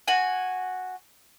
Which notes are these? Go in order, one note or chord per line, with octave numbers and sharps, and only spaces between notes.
F#4 G#5